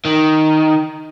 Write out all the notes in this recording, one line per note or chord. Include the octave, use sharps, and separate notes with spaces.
D#3